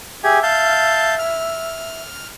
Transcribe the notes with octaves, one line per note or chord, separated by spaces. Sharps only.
G4 G#4 E5 G#5
F5 A5 G6
F6